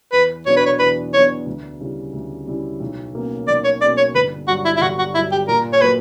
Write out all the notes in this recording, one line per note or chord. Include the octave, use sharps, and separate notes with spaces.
E2 B4
B2 F#3 B3 D4 C#5
B4
C#5
E2 B4
B2 F#3 B3 D4 C#5
D2
C#3 G3 C#4 E4
D2
C#3 G3 C#4 E4
B1
B2 A#3 C#4
B1 D5
C#5
B2 A#3 C#4 D5
C#5
G1 B4
G2 F#3 F#4
E4
E4
G1 F#4
F#4
G2 F#3 E4
G4
A#2 A#4
C#5
F#3 A#3 B4